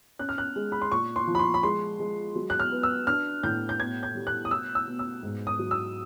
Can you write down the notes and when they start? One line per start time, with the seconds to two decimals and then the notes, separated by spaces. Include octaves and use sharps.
0.19 C#4 F#6
0.29 F6
0.38 F#6
0.56 G#3
0.72 B5
0.82 C6
0.92 A#2 C#6
1.16 C6
1.27 F3
1.35 B5
1.39 C6
1.54 B5
1.63 G#3 C6
2.00 G#3
2.35 F#3
2.50 F#6
2.60 F6
2.71 B3
2.83 E6
3.07 D4 F6
3.43 A2 G6
3.69 G6
3.79 B2 G#6
4.03 G6
4.15 G3
4.27 F#6
4.45 D#6
4.51 B2 E6
4.75 E6
4.87 B2
4.99 E6
5.23 G#2
5.47 D#6
5.59 F#3
5.71 E6